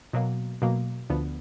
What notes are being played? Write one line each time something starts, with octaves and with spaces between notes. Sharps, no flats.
B2 F#3 A#3
B2 F#3 A#3
D2 D3 F3 B3